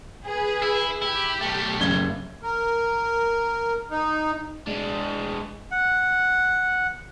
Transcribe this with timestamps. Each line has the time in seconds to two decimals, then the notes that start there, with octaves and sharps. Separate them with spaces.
0.25 G#4 B4
0.62 E4
1.02 E4 G4
1.41 B1 A3
1.80 F#1 G#6 G7
2.43 A#4
3.91 D#4
4.67 G#3 D4
5.71 F#5